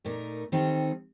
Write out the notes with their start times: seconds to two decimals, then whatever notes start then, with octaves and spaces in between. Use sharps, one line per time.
0.05 A#2 A3 D#4 A#4
0.52 D#3 G3 C4 D#4 A4